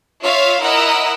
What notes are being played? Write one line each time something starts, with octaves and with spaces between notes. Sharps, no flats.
F4 C#5 E5 F5
E4 A#4 D#5 F#5 E6